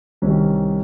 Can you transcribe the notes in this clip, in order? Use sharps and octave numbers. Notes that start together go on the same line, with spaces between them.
C2 C3 D#3 C#4